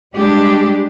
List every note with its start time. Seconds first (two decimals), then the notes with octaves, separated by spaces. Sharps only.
0.16 G3 G#3 D4 G4